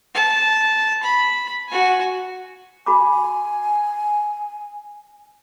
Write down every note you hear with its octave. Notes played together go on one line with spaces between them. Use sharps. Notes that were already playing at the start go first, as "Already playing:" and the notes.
A5
B5
F#4 G#5
F#4 G#5 B5 D6